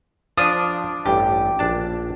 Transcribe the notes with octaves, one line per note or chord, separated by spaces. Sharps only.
F3 D4 F5 A5 D#6
A1 G2 G4
A#1 D4 A5